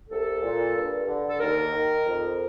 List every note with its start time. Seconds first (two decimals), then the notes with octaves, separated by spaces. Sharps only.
0.10 C2 A4
0.42 A#2
0.74 G2
1.07 D3
1.29 A4
1.40 D#2 A#4
1.72 D#3
2.05 F2